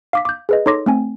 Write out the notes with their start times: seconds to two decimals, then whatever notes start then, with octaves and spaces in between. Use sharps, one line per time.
0.13 F5 D6 B6
0.25 D6 G6
0.49 G#4 B4 D#5
0.66 D#4 A4 C#5 C6 D6 A#6
0.86 A3 C4 G#5